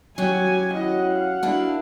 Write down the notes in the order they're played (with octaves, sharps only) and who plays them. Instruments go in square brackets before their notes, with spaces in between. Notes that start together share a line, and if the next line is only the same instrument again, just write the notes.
[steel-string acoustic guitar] F#3 C#4 G4 [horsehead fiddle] F#4 G#5
[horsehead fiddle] E4 D#5 [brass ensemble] F#4 F#5
[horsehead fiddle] F5
[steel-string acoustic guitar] A#3 D4 E4